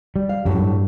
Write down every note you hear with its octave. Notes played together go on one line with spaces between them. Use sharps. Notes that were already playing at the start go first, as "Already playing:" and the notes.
G3
F5
F#2 A2 F#3 G4
G2